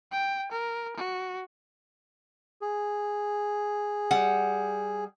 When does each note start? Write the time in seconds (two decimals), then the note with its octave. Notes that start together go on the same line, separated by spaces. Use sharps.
0.12 G5
0.52 A#4
0.97 F#4
2.61 G#4
4.11 G3 F#5